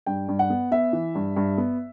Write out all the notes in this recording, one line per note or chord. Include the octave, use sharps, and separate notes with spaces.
G2 G5
G2
F#5
B3
B3 E5
E3
G2
G2
B3